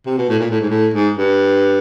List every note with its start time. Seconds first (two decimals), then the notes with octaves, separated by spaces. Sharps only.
0.06 C3
0.18 B2
0.29 A2
0.40 A#2
0.50 A2
0.60 G#2
0.69 A2
0.94 G#2
1.17 G2